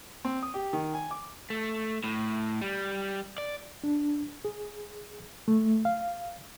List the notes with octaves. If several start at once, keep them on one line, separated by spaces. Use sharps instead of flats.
C4
D#6
G4
D#3
G#5
D6
A3
A2
G3
D5
D4
G#4
A3
F5